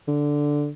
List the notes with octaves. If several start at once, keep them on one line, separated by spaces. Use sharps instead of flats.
D3